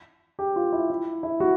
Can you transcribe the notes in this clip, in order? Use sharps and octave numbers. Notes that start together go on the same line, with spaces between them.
G4
F4
E4
E4
E4
F#4